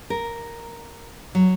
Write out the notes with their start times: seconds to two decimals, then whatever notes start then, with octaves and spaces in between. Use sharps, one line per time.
0.10 A#4
1.35 F#3